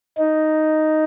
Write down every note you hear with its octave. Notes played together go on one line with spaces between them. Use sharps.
D#4